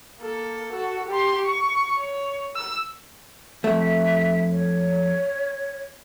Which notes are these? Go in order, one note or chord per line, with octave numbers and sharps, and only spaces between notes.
A#3 A4
F#4 A4
G4 C6
C#6
C#5
E6
F2 A3 E5
C#5